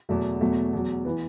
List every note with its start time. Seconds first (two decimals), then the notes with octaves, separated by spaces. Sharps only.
0.09 E2 B2 F#3 A3
0.41 E2 B2 F#3 A3
0.73 E2 B2 F#3
1.05 E3 B3